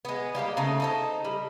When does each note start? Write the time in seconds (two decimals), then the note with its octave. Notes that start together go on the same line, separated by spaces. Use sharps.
0.05 G#3 B3
0.35 G3 A#3 F#4 G4
0.57 C#3 A3 D#4 A4
0.80 D#4 A4 C5
1.25 G3